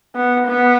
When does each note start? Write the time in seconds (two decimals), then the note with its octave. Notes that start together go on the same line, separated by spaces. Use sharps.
0.15 B3
0.47 B3